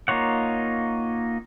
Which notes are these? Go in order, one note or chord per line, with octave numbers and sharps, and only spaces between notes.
A#3 D#4 F4 C#5 F#5